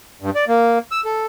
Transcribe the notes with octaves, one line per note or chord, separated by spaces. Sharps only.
G2
D5
A#3
E6
A4